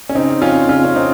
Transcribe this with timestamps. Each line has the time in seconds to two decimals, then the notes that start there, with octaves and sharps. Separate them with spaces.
0.09 C#4
0.15 C#3 C4 D#4
0.41 F2 C#4 F4
0.69 C#3 C#4 F4
0.85 C#4
0.96 C4 D#4